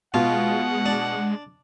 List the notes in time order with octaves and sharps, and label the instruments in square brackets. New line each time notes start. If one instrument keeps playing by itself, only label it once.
[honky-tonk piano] B2 [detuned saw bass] G#3 [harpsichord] F4 [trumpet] F#5
[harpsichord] D4